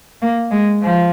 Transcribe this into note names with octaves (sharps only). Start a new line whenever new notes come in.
A#3
G#3
F3